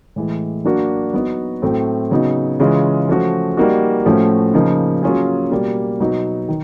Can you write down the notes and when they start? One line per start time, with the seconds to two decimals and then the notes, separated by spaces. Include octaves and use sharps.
0.16 A2 E3 G#3
0.65 F#3 A#3 D4 F#4
1.13 F#3 B3 D#4 F#4
1.62 A2 F#3 A3 C4
2.11 C#3 F#3 B3 D#4
2.59 C#3 E3 G#3 C#4 F4
3.09 F3 A3 C#4 F#4
3.57 G3 A#3 D#4 F#4
4.06 A2 F3 A3 C#4 F#4
4.54 C#3 F3 A#3 D#4
5.03 F#3 A#3 C#4 F4 G#4
5.51 B2 G3 A#3
6.00 B2 F#3 B3 D#4
6.49 D#3